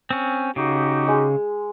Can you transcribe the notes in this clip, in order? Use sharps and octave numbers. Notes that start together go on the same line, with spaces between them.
C4 C#4
C#3 D#4 F#4 G4
G#3